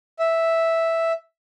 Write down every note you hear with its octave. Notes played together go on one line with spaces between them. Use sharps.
E5